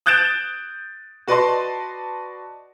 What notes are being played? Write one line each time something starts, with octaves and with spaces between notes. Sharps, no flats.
D#6 F#6 G6 A6 D7 E7
F#4 B4 D5 D#5 A5 C6